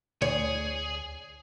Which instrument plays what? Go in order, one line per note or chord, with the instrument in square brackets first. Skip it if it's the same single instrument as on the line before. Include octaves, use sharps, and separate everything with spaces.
[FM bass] D2 [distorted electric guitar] G#4 [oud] C#5